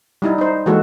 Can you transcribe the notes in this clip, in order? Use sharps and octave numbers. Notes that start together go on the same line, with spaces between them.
G3 D#4 E4
D#4 C5
E3 G#3 A#3 F#4 A4